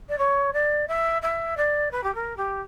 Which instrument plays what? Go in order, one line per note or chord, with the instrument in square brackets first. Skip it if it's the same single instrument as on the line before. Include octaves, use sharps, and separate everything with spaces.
[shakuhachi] D5
C#5
D5
E5
E5
D5
B4
G4
A#4
G4